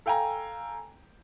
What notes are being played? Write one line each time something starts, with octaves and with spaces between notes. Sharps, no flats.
A4 F5 G5 G#5 A#5